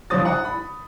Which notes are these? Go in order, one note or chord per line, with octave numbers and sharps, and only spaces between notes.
G1 F3 F#3 C5 D#6 A6
F#5 D#6
B5